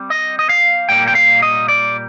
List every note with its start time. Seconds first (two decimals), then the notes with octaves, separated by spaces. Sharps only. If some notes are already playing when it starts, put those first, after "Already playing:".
Already playing: G3 C4
0.10 D#5
0.39 D#5
0.49 F5
0.89 A#2 G3 A#3 G5
1.08 G5
1.15 F5
1.42 D#5
1.68 D5